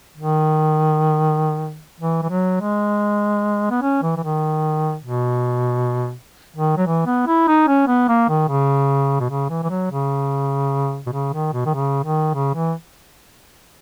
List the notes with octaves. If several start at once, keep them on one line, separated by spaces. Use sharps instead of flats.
D#3
E3
E3
F#3
G#3
B3
C#4
E3
E3
D#3
B2
D#3
F#3
E3
B3
E4
D#4
C#4
B3
A#3
D#3
C#3
B2
C#3
E3
E3
F#3
C#3
B2
C#3
D#3
B2
D#3
C#3
D#3
C#3
E3